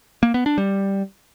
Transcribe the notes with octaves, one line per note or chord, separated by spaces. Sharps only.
A#3
B3
D4
G3